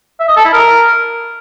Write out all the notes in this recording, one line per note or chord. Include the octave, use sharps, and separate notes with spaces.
E5
D#5
A4
E4
A#4